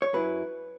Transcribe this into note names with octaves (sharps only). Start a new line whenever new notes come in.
C#5
F#2 F#3 E4 B4